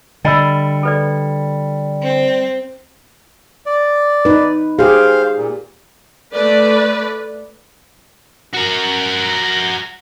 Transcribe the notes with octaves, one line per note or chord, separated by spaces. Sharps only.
D3 G3 D#5 B5 E6
A4 B4 D5
C4
D5
D#4 B4
G4 G#4 C5 F5
A#2
A3 B4 D5
F#4 A#4